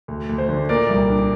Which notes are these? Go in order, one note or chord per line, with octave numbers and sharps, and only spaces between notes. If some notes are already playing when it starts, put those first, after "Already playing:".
D2
D2
C5
D3
A#2 A#4 D5
C2
D4